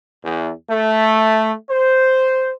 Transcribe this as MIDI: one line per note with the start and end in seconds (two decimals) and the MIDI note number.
0.24 0.52 40
0.70 1.53 57
1.71 2.51 72